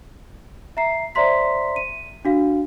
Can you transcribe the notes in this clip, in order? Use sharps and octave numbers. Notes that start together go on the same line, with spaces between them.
E5 A#5 C7
C5 D5 E5 A#5 C6 B6
D#7
D4 F#4 F5